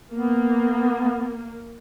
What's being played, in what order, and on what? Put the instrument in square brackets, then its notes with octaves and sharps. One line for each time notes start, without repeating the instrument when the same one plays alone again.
[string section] A#3 [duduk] B3